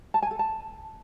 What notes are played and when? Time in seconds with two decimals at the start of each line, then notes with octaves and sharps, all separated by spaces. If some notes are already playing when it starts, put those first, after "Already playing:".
0.14 A5
0.22 G#5
0.31 A4
0.39 A5